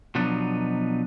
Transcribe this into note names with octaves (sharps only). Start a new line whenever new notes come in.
B2 F3 F#3 B3 D4 D#4